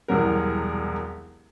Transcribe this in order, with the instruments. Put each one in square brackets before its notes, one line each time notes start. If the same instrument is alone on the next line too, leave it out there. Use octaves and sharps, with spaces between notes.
[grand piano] E1 C2 F#3 A#4